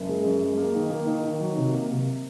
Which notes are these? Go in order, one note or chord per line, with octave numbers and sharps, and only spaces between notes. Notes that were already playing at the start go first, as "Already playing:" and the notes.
Already playing: F#1
G#3
F#2
G#3
A#3
D#3
A#3
D#3
D#3
F#3
C3
A#3
C3